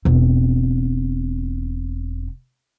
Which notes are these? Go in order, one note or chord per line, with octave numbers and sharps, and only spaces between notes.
E1 C4